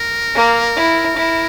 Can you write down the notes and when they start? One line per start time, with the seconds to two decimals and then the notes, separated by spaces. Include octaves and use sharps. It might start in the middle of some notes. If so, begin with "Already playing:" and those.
Already playing: A#4
0.35 A#3
0.76 E4
1.16 E4